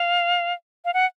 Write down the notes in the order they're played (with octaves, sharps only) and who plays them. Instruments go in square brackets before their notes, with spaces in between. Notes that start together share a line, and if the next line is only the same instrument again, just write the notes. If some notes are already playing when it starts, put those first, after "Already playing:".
Already playing: [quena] F5
F5
F#5